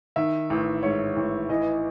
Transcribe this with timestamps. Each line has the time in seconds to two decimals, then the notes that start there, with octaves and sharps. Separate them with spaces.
0.16 D#3 E5
0.50 A1
0.83 G#2 C#5
1.17 A1
1.49 E3 D#5